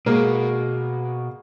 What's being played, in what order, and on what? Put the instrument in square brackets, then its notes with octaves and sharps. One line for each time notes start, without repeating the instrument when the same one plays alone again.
[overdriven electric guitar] B2 [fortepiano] G#3 A#3